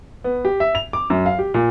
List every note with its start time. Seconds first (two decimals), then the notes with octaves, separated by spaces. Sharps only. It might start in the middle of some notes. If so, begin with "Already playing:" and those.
0.24 B3
0.45 G4
0.60 E5
0.75 F7
0.93 D6
1.10 F#2
1.26 F5
1.39 G4
1.54 A#2